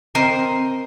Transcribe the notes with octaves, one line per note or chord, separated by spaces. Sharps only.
C4 A#4 C5 D#5